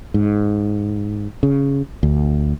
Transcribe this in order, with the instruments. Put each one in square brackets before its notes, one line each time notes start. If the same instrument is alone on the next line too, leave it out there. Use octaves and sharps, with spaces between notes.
[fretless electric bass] G#2
C#3
D2